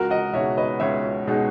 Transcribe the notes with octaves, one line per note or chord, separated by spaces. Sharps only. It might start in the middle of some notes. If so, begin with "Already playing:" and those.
Already playing: C#2 F#4 A#4
D#5 F#5
B2 G#3 D#4 F#4 C#5 E5
B4 D#5
C#2 C#5 E5
B2 G#3 D#4 F#4